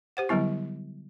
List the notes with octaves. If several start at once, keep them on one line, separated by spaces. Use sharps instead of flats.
G4 C5 F#5
D3 F#3 G3 B3 E4